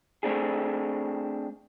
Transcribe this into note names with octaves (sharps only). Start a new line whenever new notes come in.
A3 C4 D4 G#4